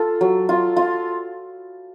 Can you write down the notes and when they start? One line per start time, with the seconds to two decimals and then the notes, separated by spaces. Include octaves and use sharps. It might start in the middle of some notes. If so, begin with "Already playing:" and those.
Already playing: F4 A4
0.21 F#3
0.49 F4
0.77 F4